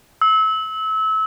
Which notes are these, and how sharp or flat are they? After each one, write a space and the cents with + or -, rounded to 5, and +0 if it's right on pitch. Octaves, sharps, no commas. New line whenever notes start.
E6 -30